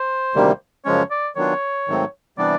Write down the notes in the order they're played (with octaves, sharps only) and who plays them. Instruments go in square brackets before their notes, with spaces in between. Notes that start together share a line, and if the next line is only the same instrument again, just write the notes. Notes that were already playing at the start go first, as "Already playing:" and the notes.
Already playing: [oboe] C5
[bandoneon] D2 C3 D#3 G3 A#3
[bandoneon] F#2 C#3 F3 G#3 C#4 [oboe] C#5
[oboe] D5
[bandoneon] D#3 F#3 B3 D4 F4 [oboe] C#5
[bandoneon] G#2 D#3 F#3 A3 C4
[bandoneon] C3 E3 G3 B3 D4 [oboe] D5